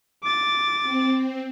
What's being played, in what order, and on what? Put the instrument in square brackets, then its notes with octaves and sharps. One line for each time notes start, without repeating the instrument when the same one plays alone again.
[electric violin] D6 A6
[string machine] C4